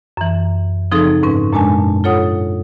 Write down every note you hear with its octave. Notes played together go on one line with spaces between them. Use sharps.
F#2 E3
C#3 F3 C4 D#4 G#4 A4
G#2 C#4 B4 C#6
F#2 A#2 G#3 D4 G#5 A5
F4 A4 C#5 F#5 D#6